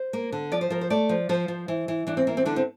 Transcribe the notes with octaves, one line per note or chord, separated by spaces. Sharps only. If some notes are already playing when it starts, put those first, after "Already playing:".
Already playing: C5
A#3
D3
F3 D5
C5
F3 A#4
C5
A3 D5
F3
F3 C5
F3
E3
E3
E3 D4
C4
E3 A#3
C4
D3 D4
C4